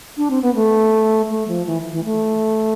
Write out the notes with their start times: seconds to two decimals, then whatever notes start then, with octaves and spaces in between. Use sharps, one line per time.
0.17 D4
0.31 C4
0.42 B3
0.55 A3
1.30 A3
1.48 F3
1.67 E3
1.92 E3
2.05 A3